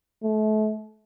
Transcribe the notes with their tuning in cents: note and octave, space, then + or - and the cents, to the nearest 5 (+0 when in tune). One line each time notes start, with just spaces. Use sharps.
A3 -35